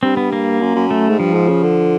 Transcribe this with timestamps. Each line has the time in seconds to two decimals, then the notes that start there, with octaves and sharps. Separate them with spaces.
0.03 G2 C4
0.17 B3
0.33 A#3
0.61 F#2
0.75 F#2
0.91 A3
1.09 G#2
1.19 G2 F3
1.34 G#2
1.48 C#3
1.63 D3